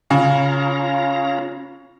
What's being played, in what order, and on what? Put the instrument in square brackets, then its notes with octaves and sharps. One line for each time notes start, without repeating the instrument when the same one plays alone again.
[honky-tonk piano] C#3 [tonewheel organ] C#4 F4 A#5